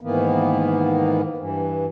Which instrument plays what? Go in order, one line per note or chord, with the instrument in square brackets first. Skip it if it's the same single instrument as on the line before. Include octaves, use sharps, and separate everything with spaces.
[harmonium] G#2 D#3 E3 A#3 B3
G2 E3